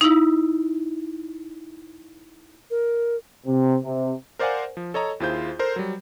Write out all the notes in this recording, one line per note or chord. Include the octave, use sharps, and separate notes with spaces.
D#4 E4
A#4
C3
C3
A#4 C5 D5 F5 F#5 G#5
F3
A4 C#5 D#5 A#5
D#2 E4 F4 G#4 C5 G6
A4 A#4 C5
F#3 G3